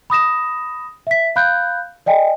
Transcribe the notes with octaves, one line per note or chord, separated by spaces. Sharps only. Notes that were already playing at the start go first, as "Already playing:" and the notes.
B5 D#6 A#6 E7
E5 B6
F5 B5 F#6 G6
D5 D#5 G5 G#5